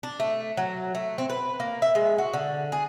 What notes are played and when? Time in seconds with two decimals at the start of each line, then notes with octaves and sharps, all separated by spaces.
0.03 D4
0.20 A3
0.57 F#3
0.95 A3
1.18 C4
1.30 B4
1.60 A#3
1.82 E5
1.95 G#3
2.18 F#4
2.33 D3
2.72 G#4